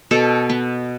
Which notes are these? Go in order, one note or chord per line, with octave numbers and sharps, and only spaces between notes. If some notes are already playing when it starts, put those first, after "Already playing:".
B2 A4
B3